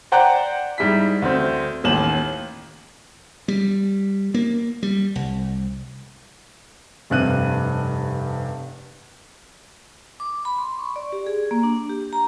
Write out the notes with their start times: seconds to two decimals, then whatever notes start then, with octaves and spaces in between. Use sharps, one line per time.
0.12 C5 D5 F#5 G5 A#5 F#6
0.78 G#2 G3 E4 B6
1.22 D2 C4
1.84 A1 D#2 E7 F#7
3.48 G3
4.34 A#3
4.83 G3
5.16 C2
7.10 F1 G2 C3 F#6 D#7
10.20 D6
10.45 B5
10.58 C6
10.79 C#6
10.96 D5
11.12 G4
11.26 G#4
11.51 A#3
11.63 D4
11.89 G4
12.13 A#5